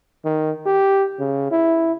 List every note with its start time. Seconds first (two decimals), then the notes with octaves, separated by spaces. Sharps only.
0.24 D#3
0.66 G4
1.19 C#3
1.51 E4